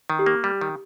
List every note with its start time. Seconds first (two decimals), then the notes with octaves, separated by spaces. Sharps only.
0.10 D#3
0.19 G4
0.26 A#3
0.44 G3
0.61 D#3